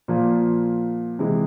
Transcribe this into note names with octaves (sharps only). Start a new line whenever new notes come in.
A#2 F3 A#3 F4
C3 E3 G#3 E4